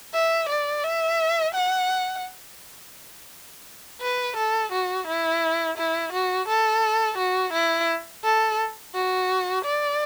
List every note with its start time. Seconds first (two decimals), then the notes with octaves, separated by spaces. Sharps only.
0.14 E5
0.49 D5
0.84 E5
1.55 F#5
4.01 B4
4.36 A4
4.72 F#4
5.07 E4
5.77 E4
6.13 F#4
6.48 A4
7.18 F#4
7.53 E4
8.24 A4
8.95 F#4
9.65 D5